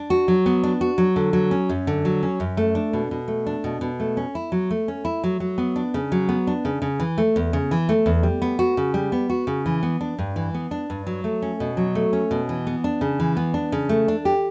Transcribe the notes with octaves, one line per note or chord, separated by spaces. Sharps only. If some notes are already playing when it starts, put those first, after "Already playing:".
Already playing: D4
F#4
F#3
B3
D4
F#4
F#3
D3
F#3
C#4
F#2
D3
F#3
C#4
F#2
A3
D4
B2
B2
A3
D4
B2
B2
A3
C#4
E4
F#3
A3
C#4
E4
F#3
F#3
B3
D4
C#3
F#3
B3
D4
C#3
C#3
E3
A3
E2
C#3
E3
A3
E2
G3
B3
F#4
C#3
G3
B3
F#4
C#3
E3
B3
D4
G2
E3
B3
D4
G2
F#3
A3
C#4
B2
F#3
A3
C#4
B2
E3
B3
D4
C#3
E3
B3
D4
C#3
A3
D4
G4